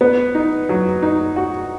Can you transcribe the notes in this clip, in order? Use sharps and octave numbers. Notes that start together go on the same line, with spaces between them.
B3
D#4
F#3
D#4
F#4